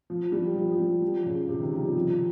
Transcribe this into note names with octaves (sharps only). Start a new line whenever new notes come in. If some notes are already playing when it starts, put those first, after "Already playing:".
F3
G3
F3
F3
G3
F3
C#3
C3
D#3
F3
G3
F3